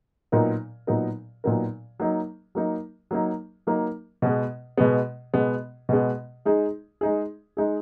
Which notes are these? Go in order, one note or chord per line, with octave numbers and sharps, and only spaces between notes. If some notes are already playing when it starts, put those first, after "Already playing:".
A#2 F#3 B3 D#4 A#4
A#2 F#3 B3 D#4 A#4
A#2 F#3 B3 D#4 A#4
F#3 A#3 D#4
F#3 A#3 D#4
F#3 A#3 D#4
F#3 A#3 D#4
B2 G#3 B3
B2 G#3 B3
B2 G#3 B3
B2 G#3 B3
G#3 D#4 G#4
G#3 D#4 G#4
G#3 D#4 G#4